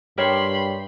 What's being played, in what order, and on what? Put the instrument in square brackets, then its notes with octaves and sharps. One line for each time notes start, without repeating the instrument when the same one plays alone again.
[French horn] G2 [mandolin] G4 E5 G5 [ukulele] A#4 C#5 [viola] B5 C6